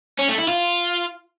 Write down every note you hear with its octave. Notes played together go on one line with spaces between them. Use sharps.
C#4
A3
E4
F4